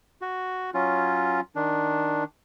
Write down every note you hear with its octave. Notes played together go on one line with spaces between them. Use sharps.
F#4
F#3 C#4 F4
D#3 D4